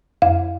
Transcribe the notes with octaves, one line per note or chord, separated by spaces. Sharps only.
F2 F5